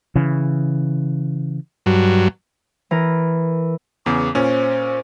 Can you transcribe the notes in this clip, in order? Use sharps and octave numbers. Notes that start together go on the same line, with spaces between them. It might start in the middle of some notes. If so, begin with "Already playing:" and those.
C#3 E3
G2 F#3
E3 A#4
E2 C#3 B3 D6
A#2 C#4 C5